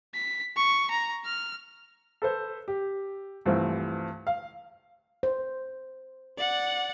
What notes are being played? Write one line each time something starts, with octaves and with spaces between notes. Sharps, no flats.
B6
C#6
A#5
F6
A4 B4 C5
G4
C2 G2 E3 F3 A3 C4
F5
C5
D5 F#5